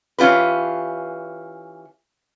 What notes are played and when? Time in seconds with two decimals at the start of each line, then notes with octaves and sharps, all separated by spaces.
0.18 E3 C#4 F4 G4 B4